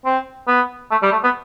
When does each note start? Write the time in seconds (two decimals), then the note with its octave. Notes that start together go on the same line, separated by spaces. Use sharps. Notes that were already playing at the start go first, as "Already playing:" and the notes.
0.05 C4
0.48 B3
0.91 A3
1.02 G3
1.12 A3
1.24 B3